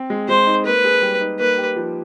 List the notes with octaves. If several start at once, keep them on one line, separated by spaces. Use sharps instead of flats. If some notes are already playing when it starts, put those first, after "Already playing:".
Already playing: C4
G#3
G#3 C5
D#4
A#3 B4
G#4
G3
D#4
A#3 B4
G4
F3